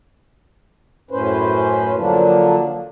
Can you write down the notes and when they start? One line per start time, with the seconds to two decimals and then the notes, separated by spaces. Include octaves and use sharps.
1.11 F#2 A2 C#4 B4 C5
1.97 D3 F3 F#3 A#3 D4